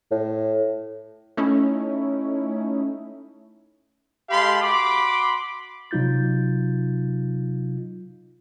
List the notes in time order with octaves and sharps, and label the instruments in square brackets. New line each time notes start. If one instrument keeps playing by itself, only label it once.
[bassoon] A2
[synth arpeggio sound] A3 C#4 D#4 E4
[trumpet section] G#3 G4 A4 F5 B5 C6
F#4 B5 C6 D6
[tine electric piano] C3 F#3 D#4 F4 G6 A6